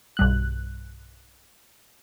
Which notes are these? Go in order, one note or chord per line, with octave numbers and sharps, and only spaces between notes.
B1 G2 F#6